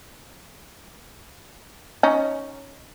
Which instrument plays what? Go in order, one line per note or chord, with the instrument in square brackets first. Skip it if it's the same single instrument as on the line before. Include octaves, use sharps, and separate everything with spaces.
[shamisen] C#4 D#4